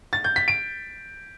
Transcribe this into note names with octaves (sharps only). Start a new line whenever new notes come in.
A6
G6
B6
D7